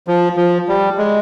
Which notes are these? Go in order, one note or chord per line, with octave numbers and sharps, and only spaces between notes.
F3
F3
G3
G#3